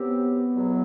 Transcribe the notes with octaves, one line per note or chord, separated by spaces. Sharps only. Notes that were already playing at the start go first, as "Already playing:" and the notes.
Already playing: C3 F#3 B3 C4 G4
E2 B2 F#3